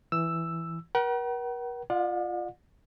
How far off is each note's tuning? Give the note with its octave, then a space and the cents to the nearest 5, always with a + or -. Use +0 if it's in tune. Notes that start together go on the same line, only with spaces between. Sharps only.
E3 +0 E6 +5
A#4 +45 F#5 +45
F4 -5 D5 +40 F#5 -45